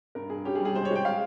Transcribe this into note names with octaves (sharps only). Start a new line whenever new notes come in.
G2 A#4
G2 G#4
C#4 G4
G#4
G3
G#4
G#3 C5
C#5
G#3 G5
F5